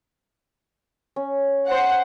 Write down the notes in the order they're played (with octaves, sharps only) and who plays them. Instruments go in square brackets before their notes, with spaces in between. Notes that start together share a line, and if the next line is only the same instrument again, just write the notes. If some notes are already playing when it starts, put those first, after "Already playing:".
[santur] C#4
[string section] C5 F#5